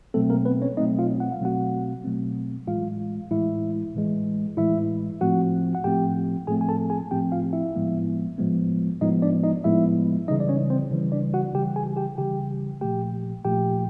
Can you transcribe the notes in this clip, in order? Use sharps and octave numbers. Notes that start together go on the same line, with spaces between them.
B2 F#3 A3 C4 A4
A#3 A#4
B3 B4
C#4 C#5
B2 F#3 A3 C4 D#4 D#5
F4 F5
F#5
F5
B2 F#3 A3 C4 F#4 F#5
B2 F#3 A3 C4
A2 E3 G#3 F4 F5
A2 E3 G#3 E4 E5
A2 E3 G#3
A2 E3 G#3 E4 E5
A2 F3 A3 C4 F#4 F#5
F#5
A2 F3 A3 C4 G4 G5
A2 F3 A3 C4 G#4 G#5
G#5
A4 A5
G#4 G#5
A2 F3 A3 C4 G4 G5
F4 F5
E4 E5
A2 F3 G#3 B3
A2 F3 G#3 B3
A2 F3 G#3 B3 D#4 D#5
D4 D5
D#4 D#5
A2 F3 G#3 B3 E4 E5
C#3 E3 G3 D#4 D#5
D5
C#4 C#5
C4 C5
C#3 E3 G3
D4 D5
F#4 F#5
C#3 E3 G3 G4 G5
G#4 G#5
G4 G5
C#3 E3 G3 G4 G5
A#2 F3 A3 G4 G5
A#2 F3 A3 G4 G5